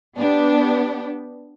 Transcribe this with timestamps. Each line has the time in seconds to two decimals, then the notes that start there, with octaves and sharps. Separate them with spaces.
0.16 B3 D4 G4